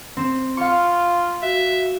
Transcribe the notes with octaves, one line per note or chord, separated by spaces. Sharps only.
C4 E7
F4 F5 C#6
F#4 E5